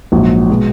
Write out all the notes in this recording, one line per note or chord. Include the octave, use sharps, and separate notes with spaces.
A#1 G#2 F#3
B2 G#3